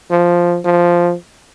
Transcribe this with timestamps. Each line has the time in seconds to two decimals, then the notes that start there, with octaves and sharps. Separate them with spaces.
0.11 F3
0.65 F3